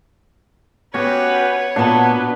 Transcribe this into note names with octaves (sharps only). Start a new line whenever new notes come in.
B3 C#4 F#4 G4 B4 C#5
A#2 B3 D4 F#4 B4 F#5 A5